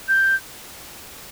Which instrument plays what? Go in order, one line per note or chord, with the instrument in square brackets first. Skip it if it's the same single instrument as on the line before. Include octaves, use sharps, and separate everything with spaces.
[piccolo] G6